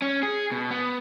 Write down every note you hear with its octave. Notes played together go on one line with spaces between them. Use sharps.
C#4
G#4
B2
B3